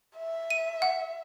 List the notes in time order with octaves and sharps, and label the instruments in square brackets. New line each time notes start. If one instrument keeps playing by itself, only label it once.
[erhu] E5
[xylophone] D#7
F#5